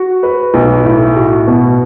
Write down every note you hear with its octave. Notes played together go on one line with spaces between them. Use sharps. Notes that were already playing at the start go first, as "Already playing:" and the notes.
Already playing: F#4
B4
B1
A2
F#4
B2